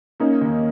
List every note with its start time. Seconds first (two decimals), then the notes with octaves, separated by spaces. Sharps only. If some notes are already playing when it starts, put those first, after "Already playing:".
0.20 A#3 C#4 D#4
0.41 D#2